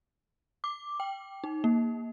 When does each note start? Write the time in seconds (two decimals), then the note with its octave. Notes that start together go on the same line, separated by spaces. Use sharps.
0.64 D6
1.00 G5
1.44 D#4
1.64 A#3